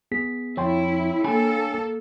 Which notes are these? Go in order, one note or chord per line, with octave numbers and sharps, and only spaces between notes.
B3 G#4 B6
F2 E4 C#5 G5 C6
A#3 D4 A4 G#5 B5